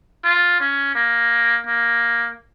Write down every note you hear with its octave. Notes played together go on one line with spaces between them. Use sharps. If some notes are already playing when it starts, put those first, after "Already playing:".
F4
C#4
A#3
A#3